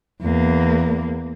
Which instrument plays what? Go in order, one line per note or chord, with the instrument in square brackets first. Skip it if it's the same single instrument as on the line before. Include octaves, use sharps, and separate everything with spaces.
[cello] E2 A#3